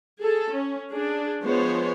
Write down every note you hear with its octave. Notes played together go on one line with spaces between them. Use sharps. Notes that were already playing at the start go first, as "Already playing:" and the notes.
G#4 A4
C#4
D4 G#4
F3 G#3 B3 C5 C#5